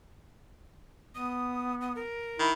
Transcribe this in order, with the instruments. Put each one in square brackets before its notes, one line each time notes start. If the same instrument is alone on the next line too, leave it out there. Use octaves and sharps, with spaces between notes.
[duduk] B3 [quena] D#6
[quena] D#6
A#4
[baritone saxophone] D#3 [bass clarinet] E4